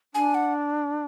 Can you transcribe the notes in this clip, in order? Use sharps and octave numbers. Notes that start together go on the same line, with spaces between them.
D4 G#5
F#5